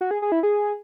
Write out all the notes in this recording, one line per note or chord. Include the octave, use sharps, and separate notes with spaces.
F#4
G#4
G#4
E4
G#4